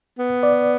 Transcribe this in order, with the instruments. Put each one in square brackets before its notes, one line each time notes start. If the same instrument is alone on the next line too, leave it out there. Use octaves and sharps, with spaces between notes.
[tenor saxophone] B3
[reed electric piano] D5